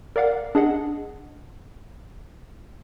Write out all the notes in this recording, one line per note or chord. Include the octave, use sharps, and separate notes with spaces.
A#4 D5 F5 F#5
D4 G#4 D#5 F#5